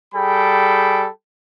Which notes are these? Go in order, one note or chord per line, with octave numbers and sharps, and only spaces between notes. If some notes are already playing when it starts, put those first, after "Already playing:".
G3 G#4 A4 G5 B5